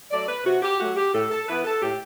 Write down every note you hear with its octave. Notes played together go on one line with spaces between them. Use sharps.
F#3 A3 D5
B4
C3 F#4
G4
F#3 A3 F#4
G4
A2 A4
A4
E3 B3 E4 B4
A4
A2 G4